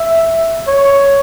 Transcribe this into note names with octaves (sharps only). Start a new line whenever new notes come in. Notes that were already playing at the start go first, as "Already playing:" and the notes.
Already playing: E5
C#5